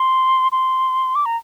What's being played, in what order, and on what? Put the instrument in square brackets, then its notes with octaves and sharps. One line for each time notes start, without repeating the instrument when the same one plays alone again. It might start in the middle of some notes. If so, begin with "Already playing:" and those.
Already playing: [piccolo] C6
C6
D6
A#5